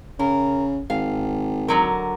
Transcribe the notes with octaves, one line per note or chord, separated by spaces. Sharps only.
C#3 A#4
G#1 F5
D3 F#3 A#4